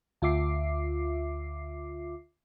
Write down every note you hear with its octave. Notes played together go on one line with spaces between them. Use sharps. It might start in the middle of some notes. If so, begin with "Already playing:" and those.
D2 F4 E5 D6 C7